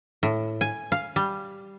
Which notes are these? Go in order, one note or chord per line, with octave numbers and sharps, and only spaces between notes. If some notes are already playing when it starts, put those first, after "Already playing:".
A2
G#5
F5
G3